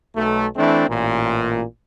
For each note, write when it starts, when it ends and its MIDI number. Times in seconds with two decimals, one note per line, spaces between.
0.16 0.47 35
0.16 0.47 57
0.56 0.87 52
0.56 0.87 57
0.56 0.87 60
0.56 0.87 62
0.89 1.63 33
0.89 1.63 46